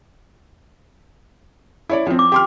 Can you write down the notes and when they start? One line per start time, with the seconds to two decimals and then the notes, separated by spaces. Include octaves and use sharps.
1.90 E4 C#5 D5
2.07 F3 C4
2.19 D6
2.32 G4 C6 F6